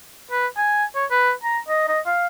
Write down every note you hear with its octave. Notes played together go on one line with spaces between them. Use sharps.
B4
G#5
C#5
B4
A#5
D#5
D#5
F5